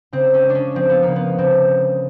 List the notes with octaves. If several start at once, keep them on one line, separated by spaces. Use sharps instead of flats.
C#3 C4
C#4
G#3
D4
C#4
F3 C4
B3
C#3 A#3
B3
C#3 C4
G#3